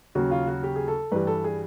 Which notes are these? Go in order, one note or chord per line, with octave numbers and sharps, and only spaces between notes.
D#2 C#3 F#3 F#4
F4
F#4
G4
G#4
A4
G2 E3 G3 B4
A4
G#4